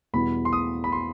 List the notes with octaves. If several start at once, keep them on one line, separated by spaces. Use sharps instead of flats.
E2 B2 G3 B3 E4 B5
C6
D#6
B5
C6